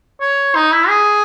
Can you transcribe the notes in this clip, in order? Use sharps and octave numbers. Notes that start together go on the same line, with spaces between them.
C#5
D#4
E4
G#4